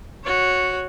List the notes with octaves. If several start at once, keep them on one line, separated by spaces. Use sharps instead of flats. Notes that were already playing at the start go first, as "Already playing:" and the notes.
F#4 C#5